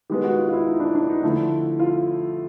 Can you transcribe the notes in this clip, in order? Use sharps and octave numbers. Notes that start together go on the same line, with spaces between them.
D#3 G#3 B3 G4
F#4
F4
F4
E4
D#4
D4
D4
D#4
D3 F3 A3 E4
F4